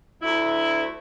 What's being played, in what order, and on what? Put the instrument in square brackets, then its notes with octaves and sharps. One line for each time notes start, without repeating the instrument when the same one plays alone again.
[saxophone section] D2 E4